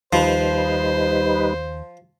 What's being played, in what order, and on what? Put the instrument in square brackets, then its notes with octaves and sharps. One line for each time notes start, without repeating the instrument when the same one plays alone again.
[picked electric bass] D#2 [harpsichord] F3 [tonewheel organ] G3 D#4 B4 [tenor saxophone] C5